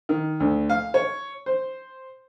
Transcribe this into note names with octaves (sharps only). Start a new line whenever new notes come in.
D#3
D2
F5
C#5
C5